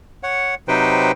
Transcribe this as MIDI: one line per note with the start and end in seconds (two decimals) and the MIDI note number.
0.23 0.55 73
0.23 0.55 78
0.68 1.12 48
0.68 1.12 54
0.68 1.12 63
0.68 1.12 71
0.68 1.12 72
0.68 1.12 79